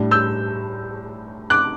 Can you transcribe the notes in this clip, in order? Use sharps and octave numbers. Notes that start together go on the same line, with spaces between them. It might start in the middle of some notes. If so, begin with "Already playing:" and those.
Already playing: A2 G3 D4
E6 G6
D6 F#6